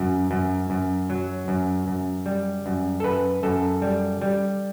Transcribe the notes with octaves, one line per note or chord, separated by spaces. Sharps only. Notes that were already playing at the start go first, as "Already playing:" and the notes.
Already playing: F#2 F#4
F#2
F#2
F#3
F#2
F#2
G3
F#2
A4
F#2 B4
F#2 A4
G3
G3